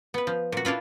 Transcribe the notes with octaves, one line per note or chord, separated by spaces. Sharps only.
B3 B4
F3
A#2 F#4
D4 E4 F4 B4